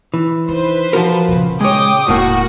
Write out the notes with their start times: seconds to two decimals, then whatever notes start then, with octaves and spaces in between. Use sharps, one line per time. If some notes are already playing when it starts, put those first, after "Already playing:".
0.14 E3
0.48 D#3 B4 C5
0.93 F3 F#4 A#4
1.28 A#2 C#3
1.61 G#3 C#5 G5 D6 D#6
2.08 E1 A2 A#3 F#4